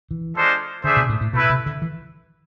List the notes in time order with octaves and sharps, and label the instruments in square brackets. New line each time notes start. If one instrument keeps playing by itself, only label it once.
[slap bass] E3
[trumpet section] G#3 D4 F4 A4 C5
[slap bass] D3 [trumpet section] A3 D4 G#4 C5 E5
[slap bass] B2
A2
A2
[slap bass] B2 [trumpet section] A3 E4 B4 E5
[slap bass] C3
D3
E3